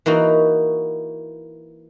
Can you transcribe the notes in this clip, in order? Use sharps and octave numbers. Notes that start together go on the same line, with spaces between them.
E3 A#3 D#4 F#4